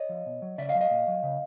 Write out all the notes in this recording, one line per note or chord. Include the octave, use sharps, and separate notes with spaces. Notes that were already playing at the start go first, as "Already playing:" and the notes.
Already playing: C#5 D#5
F3
B2
F#3
C#3 D5 E5
D#5 F5
F#3
D#5 F5
A#2
F#3
C#3